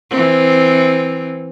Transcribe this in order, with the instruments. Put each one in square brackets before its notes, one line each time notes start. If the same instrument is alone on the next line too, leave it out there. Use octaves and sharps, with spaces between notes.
[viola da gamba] E3 C4